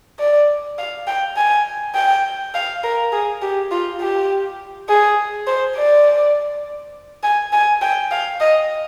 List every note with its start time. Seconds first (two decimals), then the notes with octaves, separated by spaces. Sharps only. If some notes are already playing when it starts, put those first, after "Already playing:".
0.19 D5
0.78 F5
1.07 G5
1.36 G#5
1.95 G5
2.54 F5
2.84 A#4
3.13 G#4
3.42 G4
3.71 F4
4.01 G4
4.89 G#4
5.47 C5
5.76 D5
7.23 G#5
7.53 G#5
7.82 G5
8.11 F5
8.40 D#5